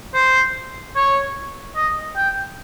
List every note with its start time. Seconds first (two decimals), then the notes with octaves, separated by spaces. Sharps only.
0.14 C5
0.96 C#5
1.76 D#5
2.16 G5